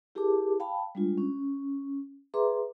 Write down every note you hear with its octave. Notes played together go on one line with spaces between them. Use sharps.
E4 G4 G#4 A#4 A5 D6
F5 G5 A5 B5
G3 G#3 D4 F4
C#4
G#4 B4 E5 A#5 C6 D6